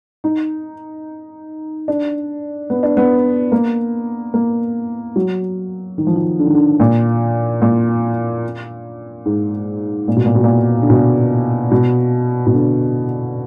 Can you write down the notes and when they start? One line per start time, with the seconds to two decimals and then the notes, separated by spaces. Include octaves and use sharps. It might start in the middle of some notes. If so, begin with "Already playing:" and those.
0.24 D#4
1.88 D4
2.70 B3
2.83 D4
2.97 B3
3.52 A#3
4.34 A#3
5.16 F#3
5.98 D#3
6.07 F3
6.16 D#3
6.39 D3
6.47 D#3
6.54 D3
6.80 A#2
7.62 A#2
9.25 G#2
10.08 A#2
10.16 B2
10.26 A#2
10.35 B2
10.44 A#2
10.82 D3
10.90 B2
11.71 B2
12.47 B2
12.54 D3